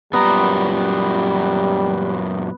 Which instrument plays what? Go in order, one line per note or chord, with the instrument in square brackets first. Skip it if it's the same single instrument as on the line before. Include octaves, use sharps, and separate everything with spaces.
[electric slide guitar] F#2 A#2 A#5 [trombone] G3 [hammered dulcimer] B3